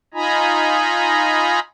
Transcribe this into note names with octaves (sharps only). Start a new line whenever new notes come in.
D#4 F4 D#5 G#5 A#5 B5